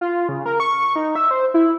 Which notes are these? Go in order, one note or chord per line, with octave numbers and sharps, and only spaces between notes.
F4
C#3
A#4
C#6
D#4
E5
C5
E4